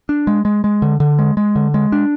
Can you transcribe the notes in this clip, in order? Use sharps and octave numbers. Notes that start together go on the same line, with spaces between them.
D4
G#3
G#3
G#3
D3
D3
G#3
G#3
D3
G#3
D4